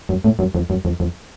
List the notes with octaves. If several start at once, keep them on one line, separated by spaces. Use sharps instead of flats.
F#2
A2
F#2
F2
F#2
F2
F2